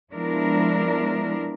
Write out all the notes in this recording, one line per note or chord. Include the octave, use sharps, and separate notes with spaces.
F3 G#3 B3 D4 E4 A#4